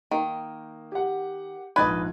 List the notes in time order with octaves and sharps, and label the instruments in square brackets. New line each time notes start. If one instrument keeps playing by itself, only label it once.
[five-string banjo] D#3 [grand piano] A#3
[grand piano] G4 F#5
[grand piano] A#1 G#2 G#6 [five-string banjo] B4 D5 D#5